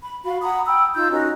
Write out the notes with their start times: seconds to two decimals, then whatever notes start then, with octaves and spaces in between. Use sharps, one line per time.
0.03 B5
0.24 F#4 F5 B5
0.42 F#5 A#5 B5 D#6
0.66 G5 B5 D#6 E6
0.95 D#4 F4 E6 G6
1.11 C#4 D#4 F#4 A#4